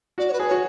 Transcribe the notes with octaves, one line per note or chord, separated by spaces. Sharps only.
F#4 D5
C#5
B4
G#4
C#5
F#4